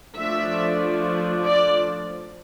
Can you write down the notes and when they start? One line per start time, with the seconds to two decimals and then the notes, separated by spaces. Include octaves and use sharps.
0.18 F3 A3 D4 E5
1.46 D5